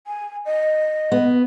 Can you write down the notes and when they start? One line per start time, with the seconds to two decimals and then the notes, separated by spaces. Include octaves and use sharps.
0.07 G#5
0.46 D#5
1.12 B3